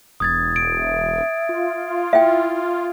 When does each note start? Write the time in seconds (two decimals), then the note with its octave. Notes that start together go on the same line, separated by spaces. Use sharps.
0.20 E1 D#6 G#6 A6
0.56 D7
0.78 E5
1.49 F4
2.13 E4 E5 G5